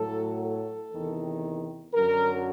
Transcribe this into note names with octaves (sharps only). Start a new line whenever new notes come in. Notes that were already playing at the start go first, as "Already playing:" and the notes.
Already playing: A2 F#3 A4
A4
E2 C3 D#3
F#2 D3 F#3 A#4